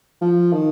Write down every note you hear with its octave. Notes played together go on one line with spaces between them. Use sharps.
F3
D#3